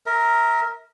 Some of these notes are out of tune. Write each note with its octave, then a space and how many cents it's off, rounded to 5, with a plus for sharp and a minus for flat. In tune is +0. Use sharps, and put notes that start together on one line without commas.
A#4 +0 E5 -35